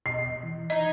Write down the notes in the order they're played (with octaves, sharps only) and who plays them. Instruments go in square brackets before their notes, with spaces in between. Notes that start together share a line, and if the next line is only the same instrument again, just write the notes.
[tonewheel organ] B2 D#5 [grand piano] C7
[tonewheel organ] E3
[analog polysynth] D#4 G#6 [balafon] D#5